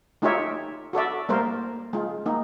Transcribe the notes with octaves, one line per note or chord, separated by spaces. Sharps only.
A3 D#4 F4 G4 C#5 E5
F#4 A4 D5 E5
G3 A3 A#3 A#4 C5
G#3 F4
A#3 D#4